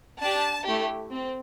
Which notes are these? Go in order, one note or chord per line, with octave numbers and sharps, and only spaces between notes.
D4 G4 A5
A3 E4 G4
C4